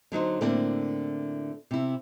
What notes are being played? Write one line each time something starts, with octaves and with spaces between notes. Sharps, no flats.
D3 F#3 D#4 C5
A2 D3 A#3 C4 D4 E4
C3 E4